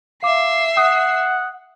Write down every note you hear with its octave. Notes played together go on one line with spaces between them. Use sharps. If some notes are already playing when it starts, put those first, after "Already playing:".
E5 F5 D6 C7
F#5 D#6